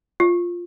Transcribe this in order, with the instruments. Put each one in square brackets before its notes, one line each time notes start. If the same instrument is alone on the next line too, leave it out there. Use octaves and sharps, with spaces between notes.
[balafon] F4